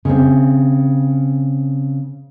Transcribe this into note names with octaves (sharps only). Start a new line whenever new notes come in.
C#3 C4